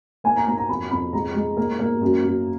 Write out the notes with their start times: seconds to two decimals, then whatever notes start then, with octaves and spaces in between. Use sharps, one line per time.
0.24 A#3 G#5
0.36 A#5
0.47 A#3 A#5
0.57 A#5
0.69 F2 B5
0.91 F2 B5
1.13 G#3 A#5
1.35 G#3
1.57 A#3
1.79 A#3
2.02 F#2
2.24 F#2